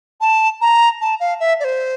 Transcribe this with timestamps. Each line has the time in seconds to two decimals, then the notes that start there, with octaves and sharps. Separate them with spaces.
0.21 A5
0.61 A#5
1.01 A5
1.20 F5
1.40 E5
1.60 D5
1.64 C5